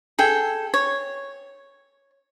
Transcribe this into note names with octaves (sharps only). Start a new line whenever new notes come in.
G#4 A4 G5
C#5